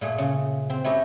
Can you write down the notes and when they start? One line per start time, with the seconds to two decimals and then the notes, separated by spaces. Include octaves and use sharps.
0.01 A#2 A3 G#4
0.18 C#3
0.70 C4
0.84 A3 C#4 E4 G4 D#5